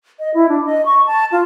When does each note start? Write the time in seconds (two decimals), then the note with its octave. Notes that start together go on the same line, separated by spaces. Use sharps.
0.19 D#5
0.34 E4
0.49 D4
0.65 D#5
0.86 C#6
1.06 A5
1.32 F4